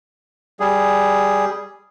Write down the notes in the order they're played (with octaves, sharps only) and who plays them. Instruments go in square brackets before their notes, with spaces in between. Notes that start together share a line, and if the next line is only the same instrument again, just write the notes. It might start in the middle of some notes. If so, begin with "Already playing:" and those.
[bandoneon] G3 G#4